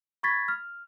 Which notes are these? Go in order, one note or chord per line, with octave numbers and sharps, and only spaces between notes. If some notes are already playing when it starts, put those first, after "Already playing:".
B5 C#6 G#6 A6 B6
F6